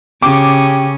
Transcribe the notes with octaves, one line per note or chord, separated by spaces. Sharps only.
C#3 C#4 G4 D6